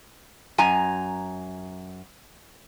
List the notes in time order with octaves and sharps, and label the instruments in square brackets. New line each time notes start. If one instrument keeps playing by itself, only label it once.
[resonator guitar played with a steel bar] F#2 G#5 A#5